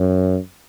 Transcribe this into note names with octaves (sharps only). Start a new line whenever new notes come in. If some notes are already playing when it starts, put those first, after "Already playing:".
Already playing: F#2